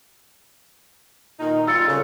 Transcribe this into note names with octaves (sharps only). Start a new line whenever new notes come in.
A#2 D#3 D#4
G3 F4 E6 A6 C#7
C#3 A4